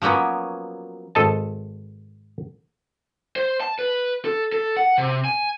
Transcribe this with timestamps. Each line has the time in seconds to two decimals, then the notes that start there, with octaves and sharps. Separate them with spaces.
0.02 F3 F#3 A#3 B3 C#4
1.15 G#1 A4 D#5 A5
3.36 C5
3.61 A5
3.79 B4
4.25 A4
4.52 A4
4.77 F#5
4.98 C3
5.25 G#5